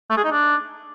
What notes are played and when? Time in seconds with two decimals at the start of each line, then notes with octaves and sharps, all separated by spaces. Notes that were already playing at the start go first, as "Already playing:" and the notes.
0.10 A3
0.17 G#4
0.24 D#4
0.31 D4